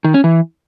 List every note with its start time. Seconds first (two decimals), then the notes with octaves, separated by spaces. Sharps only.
0.04 D#3
0.14 C#4
0.24 E3